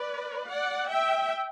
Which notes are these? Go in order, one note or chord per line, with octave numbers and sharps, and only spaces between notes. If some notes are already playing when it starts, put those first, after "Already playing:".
Already playing: B4 D5
D5 F#5
E5 G5